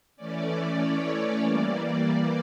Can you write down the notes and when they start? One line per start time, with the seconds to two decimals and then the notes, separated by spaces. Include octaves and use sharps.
0.17 E3 A3 C#4 D5
0.79 C#5
1.42 E3 G3 A#3 D5